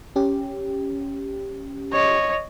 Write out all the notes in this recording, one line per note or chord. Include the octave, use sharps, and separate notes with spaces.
C#4 G4
C#5 D#5